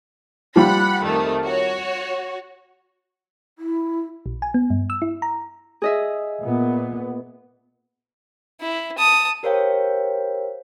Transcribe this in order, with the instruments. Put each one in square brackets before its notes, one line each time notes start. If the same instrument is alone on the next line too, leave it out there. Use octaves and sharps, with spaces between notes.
[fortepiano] F3 G3 [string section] F#5 B5
[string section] F2 D#3 A3
F#4 C#5
[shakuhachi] E4
[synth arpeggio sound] A#1
G#5
B3
G2
E6
E4
A#5
[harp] G#4 D#5 E5
[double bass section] A#2 B3
[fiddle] E4
A5 D#6
[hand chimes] G4 A#4 C5 C#5 F5 G5